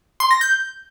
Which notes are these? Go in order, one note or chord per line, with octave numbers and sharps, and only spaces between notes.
C6
A#6
G6